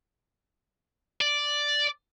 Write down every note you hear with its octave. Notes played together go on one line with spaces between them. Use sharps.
D5